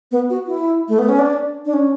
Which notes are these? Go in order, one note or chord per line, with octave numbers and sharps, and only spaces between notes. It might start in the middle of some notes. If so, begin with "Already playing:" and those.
B3
F#4
E4
A3
B3
C#4
D4
D4
C#4